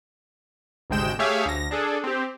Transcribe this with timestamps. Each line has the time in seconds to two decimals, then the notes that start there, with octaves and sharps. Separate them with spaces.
0.90 G#1 D2 C3 G#3 G5 E7
1.19 A3 G4 G#4 C#5 E5 F5
1.45 D2 A#6
1.71 D4 G#4 A4
2.04 C4 G4